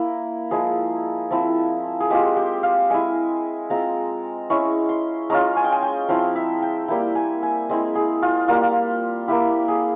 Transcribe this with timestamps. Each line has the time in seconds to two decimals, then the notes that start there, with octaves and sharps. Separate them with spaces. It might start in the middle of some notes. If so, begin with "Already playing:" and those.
Already playing: A#3 E4 A#4
0.51 F3 G#3 E4 G#4
1.31 F3 C4 E4
2.00 G#4
2.10 G#3 C4 F4 G4
2.37 G4
2.63 F5
2.90 G#3 E4 G#5
3.70 G#3 C4 F4 A#5
4.50 G#3 C#4 E4 C#6
4.89 C6
5.30 G#3 C#4 F4 A#5
5.56 G#5
5.64 G5
5.72 G#5
5.83 G5
6.09 F3 C4 E4 F5
6.36 E5
6.62 G5
6.88 G3 A#3 E4 G5
7.15 G#5
7.43 G#5
7.69 G#3 C4 E4
7.95 G#4
8.22 F4
8.48 G3 A#3 F4
9.28 A#3 E4 G4
9.68 G#4